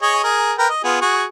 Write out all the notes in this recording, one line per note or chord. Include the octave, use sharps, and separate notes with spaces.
G#4 C#5 D#5
G#4 A#4
A#4 B4 G5
D#5
B3 F4 G#4
F#4 G#4 C#6